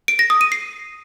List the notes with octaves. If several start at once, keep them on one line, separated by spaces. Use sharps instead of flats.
D7
A#6
D#6
D#7
C7